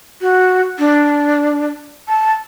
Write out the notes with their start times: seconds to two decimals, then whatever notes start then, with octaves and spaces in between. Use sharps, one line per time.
0.21 F#4
0.79 D4
2.08 A5